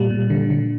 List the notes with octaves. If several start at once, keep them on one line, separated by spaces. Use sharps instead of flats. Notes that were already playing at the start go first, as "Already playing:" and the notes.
Already playing: A#2 G3
A#2
D3
D3